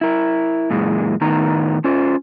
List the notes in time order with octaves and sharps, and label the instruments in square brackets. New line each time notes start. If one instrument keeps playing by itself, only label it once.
[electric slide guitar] E4 A#4
F#2 A#2 E3 G#3
A2 D#3 B3 D#4 A#5
C#4 F4 C5